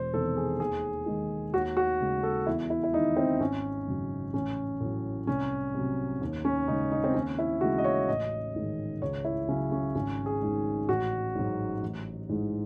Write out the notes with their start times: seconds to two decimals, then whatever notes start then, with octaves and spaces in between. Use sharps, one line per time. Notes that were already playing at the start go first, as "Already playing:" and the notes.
Already playing: E1 C5
0.13 E2 C3 D#3 A4
0.37 G#4
0.60 D#2 G#4
1.06 D#3 G#3
1.53 D#2 F#4
1.77 F#4
2.00 C#3 G#3
2.23 A4
2.46 E2 E4
2.70 E4
2.83 E4
2.94 D#3 G#3 D#4
3.17 C4
3.40 G#1 C#4
3.88 F#2 C#3 F#3
4.34 A1 C#4
4.80 A2 F#3
5.27 C2 C#4
5.74 C3 F#3
6.21 D#2
6.45 C#4
6.68 C#3 G#3 D#4
6.92 D#4
7.04 C4
7.14 D#2 C#4
7.39 E4
7.61 C#3 E3 G#3 F#4
7.78 D#5
7.84 C#5
8.09 A1 D#5
8.55 G#2 D#3 G#3
9.01 C#2 C#5
9.25 E4
9.48 C#3 F#3 C#4
9.72 C#4
9.95 G#1 C#4
10.26 G#4
10.42 G#2 D#3 G#3
10.89 A1 F#4
11.35 G#2 F#3
11.82 A1
12.29 G#2 E3 G#3